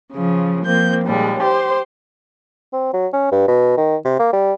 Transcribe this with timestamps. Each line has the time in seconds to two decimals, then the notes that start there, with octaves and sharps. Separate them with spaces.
0.13 C#3 F3
0.65 F3 A#3 C4 G6
1.05 D#2 A#2 G3 G#3
1.43 G4 C5 C6
2.73 C4
2.93 F#3
3.13 C#4
3.31 G2
3.48 B2
3.77 D#3
4.05 C3
4.19 A#3
4.33 G3